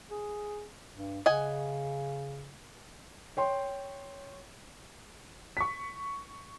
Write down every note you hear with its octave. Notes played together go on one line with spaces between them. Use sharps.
G#4
G2
C#3 D#5 F#5 G#5
C#5 G5 C6
C#6 B6